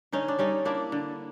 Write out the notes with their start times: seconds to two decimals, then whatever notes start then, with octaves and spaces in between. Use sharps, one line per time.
0.12 D3 C#4 D#4
0.28 D4
0.39 G3 C#4 D#4
0.65 A#3 D4 E4
0.92 D3